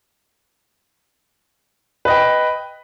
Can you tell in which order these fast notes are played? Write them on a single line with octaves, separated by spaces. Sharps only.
B4 D#5 G5